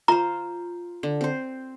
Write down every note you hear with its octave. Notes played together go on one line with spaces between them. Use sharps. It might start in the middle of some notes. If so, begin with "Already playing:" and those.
F4 C5 A#5
D3
C4 C5